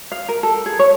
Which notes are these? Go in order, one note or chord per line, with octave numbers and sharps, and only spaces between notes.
F5
A#4
A4
G#4
C#5